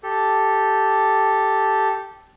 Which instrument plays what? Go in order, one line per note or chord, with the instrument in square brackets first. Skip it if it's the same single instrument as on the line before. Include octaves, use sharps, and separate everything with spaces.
[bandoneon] G4 A4